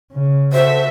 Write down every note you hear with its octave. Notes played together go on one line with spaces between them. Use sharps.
C#3
F#4 A4 C5 E5